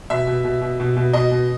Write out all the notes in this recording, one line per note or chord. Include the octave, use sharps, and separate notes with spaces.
B2 E5
B2
B2
B2
B2
B2
B2 D#5
B2